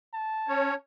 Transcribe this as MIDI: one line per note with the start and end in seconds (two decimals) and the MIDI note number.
0.14 0.75 81
0.48 0.74 61
0.48 0.74 73